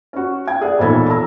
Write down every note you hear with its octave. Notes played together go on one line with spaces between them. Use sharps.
C#4 F#4
G5 G#6
G#4 D5 F#5
E1 A#1 D#4 A4 B5 G#6
A#5 E6